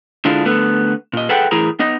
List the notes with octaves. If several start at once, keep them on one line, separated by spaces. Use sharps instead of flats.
D3 G#3 D4 E4 F4
D3 A3 B3
A#2 D#5
G#4 A4 B4 E5 F#5 G5
A2 E3 E4 G#4 A#4 A#5
B3 D#4 D#5